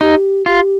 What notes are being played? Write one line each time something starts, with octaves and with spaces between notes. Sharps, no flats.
D#4 G4
F4 G4